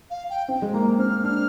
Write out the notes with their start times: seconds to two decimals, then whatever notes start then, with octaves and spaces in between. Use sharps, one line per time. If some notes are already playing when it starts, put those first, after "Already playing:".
0.10 F5
0.30 G5
0.48 C4
0.62 G#3
0.74 A#3 A#5
0.98 C4 F6
1.24 D4 F6